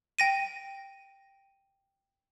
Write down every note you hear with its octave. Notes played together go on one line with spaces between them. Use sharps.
G5 A#6 D#7